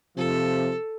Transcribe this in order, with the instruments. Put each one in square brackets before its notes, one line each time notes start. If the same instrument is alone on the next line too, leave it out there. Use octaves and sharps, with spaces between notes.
[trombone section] C3 F3 [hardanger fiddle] A4